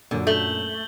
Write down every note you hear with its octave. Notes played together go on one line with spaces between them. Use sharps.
F#2 A#2 D3
A3 G6 F#7 G7